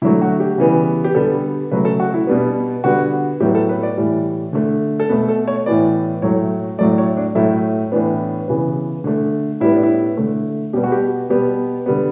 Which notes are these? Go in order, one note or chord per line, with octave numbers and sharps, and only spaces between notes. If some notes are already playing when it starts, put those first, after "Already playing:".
D3 F#3 A3 E4
F#4
G4
C#3 E3 G3 B3
G4
D3 G3 B3 A4
C#3 F#3 A3 B4
A4
F#4
E4
B2 G3 B3 D4
D3 G3 B3 F#4
A2 F#3 B3 G4
A4
B4
D5
A2 E3 G3
D3 A3
A4
B2 A3 B4
A4
C#5
A2 E3 B3 D5
A2 F#3 A3 C#5
A2 F#3 A3 D5
C#5
D4
A2 F#3 A3 E4
A2 E3 B3 D4
C#3 E3 B3
D3 A3
A2 G3 B3 E4
D4
E4
D3 A3
B2 G3 B3 G4
F#4
G4
B2 G3 B3 G4
D3 G3 B3